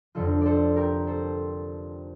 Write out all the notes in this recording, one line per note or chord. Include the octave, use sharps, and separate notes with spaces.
F1 F2 D3 F3 F4 A4
A4 C5 D5
G4 A#4
A4 C5